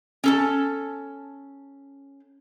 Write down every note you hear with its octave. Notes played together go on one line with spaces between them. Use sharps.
C#4 A4 A5